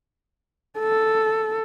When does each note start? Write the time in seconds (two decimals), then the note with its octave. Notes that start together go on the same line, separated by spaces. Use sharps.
0.79 A4